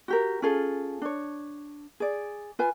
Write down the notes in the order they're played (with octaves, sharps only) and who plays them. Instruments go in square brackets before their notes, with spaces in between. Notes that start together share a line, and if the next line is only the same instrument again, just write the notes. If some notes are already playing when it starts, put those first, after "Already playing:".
[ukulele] F#4 G4 A#4
C#4 F4 G#4 A4
D4 C#5
G#4 D5
F4 B4 G#5